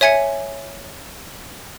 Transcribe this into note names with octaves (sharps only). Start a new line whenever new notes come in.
C#5 E5 G#5 G#6 C#7